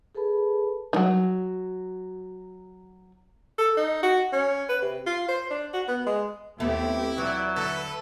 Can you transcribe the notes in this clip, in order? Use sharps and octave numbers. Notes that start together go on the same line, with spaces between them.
G#4 A4 B4 A5 B5
D#3 F#3
A4
D#4
F#4
C#4
B4
C3
F4
C5
D4
F#4
B3
G#3
D#2 A3 B3 C4 E4 G4
E3 F#3 D5
D3 A4 B4